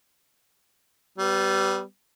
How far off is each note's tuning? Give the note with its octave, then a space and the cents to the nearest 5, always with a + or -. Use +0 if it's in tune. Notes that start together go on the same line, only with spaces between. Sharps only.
G3 -20 B3 +15